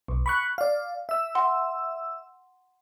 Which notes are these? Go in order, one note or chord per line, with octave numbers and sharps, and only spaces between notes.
B1
B5 C#6 F#6
D5 F5
E5 E6
F#5 C6